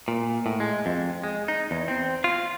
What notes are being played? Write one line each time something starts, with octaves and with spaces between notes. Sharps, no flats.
A#2
A2
G#3
F2
G#3
D#4
E2
C4
F4